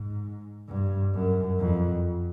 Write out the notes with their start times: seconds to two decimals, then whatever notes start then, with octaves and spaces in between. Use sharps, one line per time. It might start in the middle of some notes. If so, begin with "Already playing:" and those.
Already playing: G#2
0.69 G2
1.14 F#2
1.59 F2